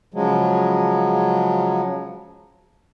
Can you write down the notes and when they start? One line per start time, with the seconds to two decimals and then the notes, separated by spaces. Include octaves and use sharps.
0.14 C#3 F3 F#3 G#3